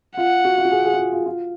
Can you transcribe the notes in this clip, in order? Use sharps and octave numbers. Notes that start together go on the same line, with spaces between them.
F4 F#5
F#4
F4
F#4
G#4
G#4
F4
F#4
F4
F4